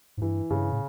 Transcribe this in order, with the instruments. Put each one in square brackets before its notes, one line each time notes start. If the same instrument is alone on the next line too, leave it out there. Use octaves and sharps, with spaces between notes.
[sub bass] G#2
[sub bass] G2 [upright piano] E3
[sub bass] G2 [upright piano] C#3
[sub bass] A2